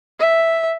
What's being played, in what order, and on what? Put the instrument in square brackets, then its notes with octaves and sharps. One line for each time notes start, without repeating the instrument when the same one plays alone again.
[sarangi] E5